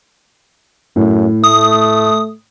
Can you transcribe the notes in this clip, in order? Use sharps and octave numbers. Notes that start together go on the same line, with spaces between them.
F#2 A2
A3 D#6